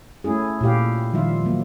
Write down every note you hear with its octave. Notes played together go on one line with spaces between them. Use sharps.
A3 C#4 E4 G#4
A#2 E4 G4 F5
D#3 F3 G3 F4 E5
F#3 A#3